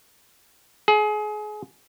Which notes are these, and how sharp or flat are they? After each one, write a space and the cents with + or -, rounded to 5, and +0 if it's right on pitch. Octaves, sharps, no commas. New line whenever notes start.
G#4 +30